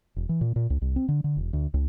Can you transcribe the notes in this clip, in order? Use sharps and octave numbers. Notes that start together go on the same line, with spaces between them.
E1
E3
A#2
A#2
C#2
C2
C4
D3
D3
E1
D2
C#2